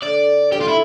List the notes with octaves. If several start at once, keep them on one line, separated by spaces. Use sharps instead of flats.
D3 D5
D3 G4
F4
E4